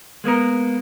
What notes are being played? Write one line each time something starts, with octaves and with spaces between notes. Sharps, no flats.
G#3 A#3 B3 A#4